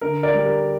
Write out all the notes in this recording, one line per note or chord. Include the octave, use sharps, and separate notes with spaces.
D3 A#4
A#4 D5
G3
A#4